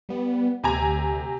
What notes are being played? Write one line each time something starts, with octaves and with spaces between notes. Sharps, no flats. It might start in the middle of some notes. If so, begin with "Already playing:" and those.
G3 B3
D2 C3 G#5 A#5